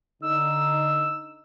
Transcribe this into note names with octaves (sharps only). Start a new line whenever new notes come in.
D3 D#4 E6